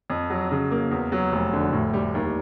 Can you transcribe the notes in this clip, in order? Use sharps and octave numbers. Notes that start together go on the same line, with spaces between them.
F2
F#3
C#3
A#3
E2
F#3
F1
D3
A2
G3
D#2